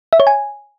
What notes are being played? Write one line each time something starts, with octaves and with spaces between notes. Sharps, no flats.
E5
C#5
G#5